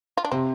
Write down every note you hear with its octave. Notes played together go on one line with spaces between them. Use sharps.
F4
D4
C3 C4